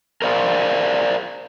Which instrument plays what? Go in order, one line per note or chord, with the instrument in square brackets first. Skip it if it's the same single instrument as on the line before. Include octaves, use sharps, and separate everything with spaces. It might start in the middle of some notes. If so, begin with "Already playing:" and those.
[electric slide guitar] A#4 C5 D5 F5